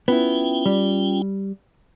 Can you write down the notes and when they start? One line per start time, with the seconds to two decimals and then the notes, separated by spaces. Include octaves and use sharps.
0.08 B3 C#4 E4 F4 G5
0.66 G3